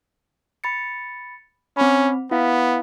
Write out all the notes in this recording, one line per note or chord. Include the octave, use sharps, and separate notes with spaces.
B5 A6 C#7
C4 C#4 B5
B3 E4 F5